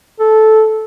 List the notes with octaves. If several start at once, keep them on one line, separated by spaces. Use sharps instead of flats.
A4